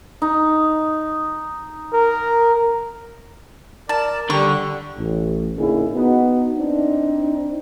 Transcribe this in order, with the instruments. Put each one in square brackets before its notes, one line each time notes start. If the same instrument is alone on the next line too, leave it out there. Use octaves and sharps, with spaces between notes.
[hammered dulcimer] D#4
[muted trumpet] A#4
[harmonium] A#4 [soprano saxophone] D5 [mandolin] A5
[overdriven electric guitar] D3 [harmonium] G3 [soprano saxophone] G4 [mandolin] C#6
[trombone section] A1
A#2 D3 C#4 D#4 E4 G#4
B3 D#4 F#4
C4 D4 D#4